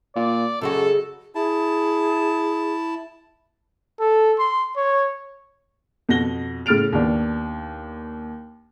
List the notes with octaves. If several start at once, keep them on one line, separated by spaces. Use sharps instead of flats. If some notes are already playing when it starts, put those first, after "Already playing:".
A#2 D5
F#2 C#3 G#3 F#4 A4
E4 G#4 A5
A4
C6
C#5
F2 B2 F#4 A#6 G7
A2 C#3 F6 A6 D7 F7
D#2 B3 D4